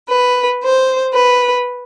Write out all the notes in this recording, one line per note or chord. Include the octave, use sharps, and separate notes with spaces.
B4
C5
B4